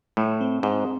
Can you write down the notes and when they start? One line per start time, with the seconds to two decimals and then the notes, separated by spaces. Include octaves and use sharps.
0.17 A2 A3
0.41 C4
0.63 G#2 C4